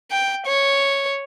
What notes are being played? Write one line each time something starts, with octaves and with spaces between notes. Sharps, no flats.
G5
C#5